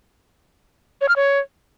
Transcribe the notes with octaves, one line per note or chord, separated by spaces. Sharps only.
C#5
F6
C#5